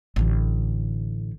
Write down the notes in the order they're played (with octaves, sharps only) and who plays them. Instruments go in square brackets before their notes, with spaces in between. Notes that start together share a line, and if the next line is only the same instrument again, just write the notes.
[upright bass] A1 D3